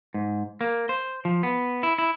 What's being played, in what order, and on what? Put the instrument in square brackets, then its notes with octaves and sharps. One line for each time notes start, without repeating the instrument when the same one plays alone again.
[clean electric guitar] G#2
A#3
C5
F3
B3
E4
E4